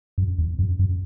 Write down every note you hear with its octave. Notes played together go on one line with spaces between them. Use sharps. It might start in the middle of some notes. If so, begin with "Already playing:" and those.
F#2
E2
F#2
F#2